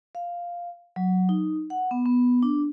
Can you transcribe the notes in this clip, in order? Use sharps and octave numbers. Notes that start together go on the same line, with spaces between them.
F5
F#3
D#4
F#5
B3
B3
D4